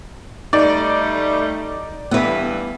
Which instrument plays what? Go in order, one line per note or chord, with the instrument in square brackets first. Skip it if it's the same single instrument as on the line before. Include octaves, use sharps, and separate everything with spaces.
[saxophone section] G3 A3 [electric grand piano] D#4 [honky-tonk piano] D5
[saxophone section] G2 E3 [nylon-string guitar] B3 B4